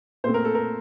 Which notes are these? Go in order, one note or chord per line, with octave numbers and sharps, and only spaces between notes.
A#2 A3 C4 C5
A#4
A4
A#4